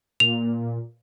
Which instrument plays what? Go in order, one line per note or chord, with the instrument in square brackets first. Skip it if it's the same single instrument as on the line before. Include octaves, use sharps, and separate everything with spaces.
[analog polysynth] A#2 [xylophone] F7